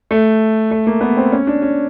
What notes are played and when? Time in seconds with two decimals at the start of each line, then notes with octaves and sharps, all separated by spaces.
0.11 A3
0.71 A3
0.87 A#3
1.01 B3
1.17 C4
1.32 C#4
1.47 D4
1.62 C#4